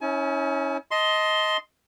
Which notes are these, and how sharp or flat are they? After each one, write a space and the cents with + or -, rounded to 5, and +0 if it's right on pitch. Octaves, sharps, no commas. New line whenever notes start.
C#4 -5 E4 -45 G#5 +40
D#5 +15 A5 +0 C6 +0